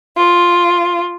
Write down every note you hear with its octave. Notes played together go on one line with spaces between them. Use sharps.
F4